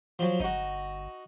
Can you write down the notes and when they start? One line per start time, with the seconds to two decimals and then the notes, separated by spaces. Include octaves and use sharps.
0.19 F3 F#3
0.40 G1 D#4 F#4